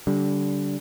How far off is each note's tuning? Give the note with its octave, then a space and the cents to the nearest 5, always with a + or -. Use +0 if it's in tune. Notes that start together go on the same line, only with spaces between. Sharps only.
D3 -30 G3 -20